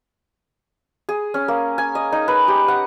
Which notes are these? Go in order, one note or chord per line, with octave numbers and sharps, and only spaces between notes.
G#4
C#4
A#3
G#5
D#5
D#4
B4
G4
F#5